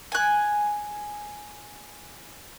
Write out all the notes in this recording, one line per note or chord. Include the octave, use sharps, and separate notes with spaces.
G#5 F#6